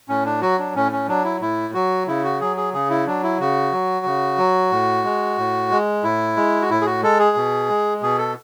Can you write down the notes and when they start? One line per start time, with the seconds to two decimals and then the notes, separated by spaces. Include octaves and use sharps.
0.09 A2 C#4
0.26 D4
0.42 F#3 F#4
0.59 D4
0.75 A2 C#4
0.92 C#4
1.08 F#3 D4
1.24 E4
1.41 A2 E4
1.74 F#3 F#4
2.07 C#3 E4
2.24 F#4
2.40 F#3 G#4
2.57 G#4
2.74 C#3 G#4
2.90 E4
3.07 F#3 D4
3.23 E4
3.40 C#3 F#4
3.72 F#3
4.06 C#3
4.38 F#3
4.72 A2
5.04 G#3
5.38 A2
5.71 G#3
6.03 A2 E4
6.36 G#3
6.62 F#4
6.70 A2 E4
6.81 G#4
6.86 F#4
7.03 G#3 A4
7.19 G#4
7.36 B2
7.69 G#3
8.02 B2 G#4
8.18 A4